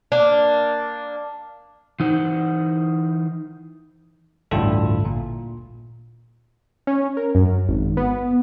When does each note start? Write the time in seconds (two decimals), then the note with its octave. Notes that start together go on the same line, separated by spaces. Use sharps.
0.12 A#3 D4
2.00 E3 D#4 C5 F#5
4.51 A1 D2 G2 E4 F4 A4
5.05 A#2
6.87 C#4
7.17 A#4
7.35 F#2
7.68 G#1
7.97 B3